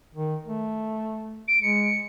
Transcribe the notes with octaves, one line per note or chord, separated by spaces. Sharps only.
D#3
A3
D7
G#3 C#7